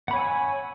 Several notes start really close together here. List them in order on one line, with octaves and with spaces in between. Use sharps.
F#5 B5 C#5 G#5 E6